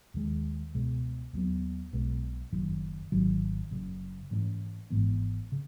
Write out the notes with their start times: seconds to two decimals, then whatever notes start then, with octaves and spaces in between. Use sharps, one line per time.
0.14 D#2 D#3 G#3
0.74 C#2 B2 G#3 B3
1.33 D#2 D#3 F#3 B3
1.93 B1 B2 G#3 B3
2.52 F#1 F#2 D#3
3.12 G#1 G#2 D#3 F#3
3.71 F#1 F#2 C#3
4.31 G#2 E3 A3 C#4
4.90 G#1 G#2 E3 B3
5.52 C#3